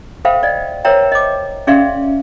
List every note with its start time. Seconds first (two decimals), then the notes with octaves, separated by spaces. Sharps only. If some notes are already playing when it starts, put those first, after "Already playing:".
0.25 A4 C5 E5 F5 G5 B5
0.43 D5 D#5
0.85 A#4 C5 C#5 E5 G5 A#5
1.12 D#5 D6
1.67 C#4 G#4 D5 E5 F5 C6